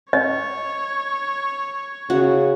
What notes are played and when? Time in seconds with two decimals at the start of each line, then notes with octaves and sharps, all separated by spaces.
0.13 C#5 D#5
2.10 C#3 F#4